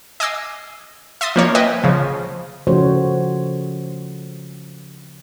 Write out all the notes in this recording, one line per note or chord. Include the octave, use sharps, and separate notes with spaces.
D#5 G#5 D6 E6 C7
E5 C6 D#6 A6
F3 A#3 C#5
B4 D#5 E5 G5 G#5
C#3 F3
C#3 F3 A3 F#4 C5 C#5